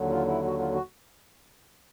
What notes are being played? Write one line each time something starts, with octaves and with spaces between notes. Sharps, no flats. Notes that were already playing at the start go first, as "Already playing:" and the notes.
Already playing: D#2 D3 F#3
F4
E4
F#4
F4
F#4